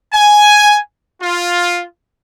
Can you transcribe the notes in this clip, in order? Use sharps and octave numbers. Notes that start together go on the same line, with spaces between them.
G#5
F4